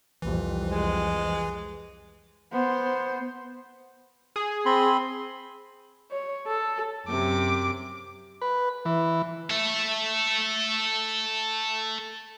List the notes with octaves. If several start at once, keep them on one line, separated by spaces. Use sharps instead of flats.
C2 F2 E3
G#3
B3 C5
G#4
C4 B5 C6
C#5
A4
F#2 C3 D6
B4
E3
A4 E5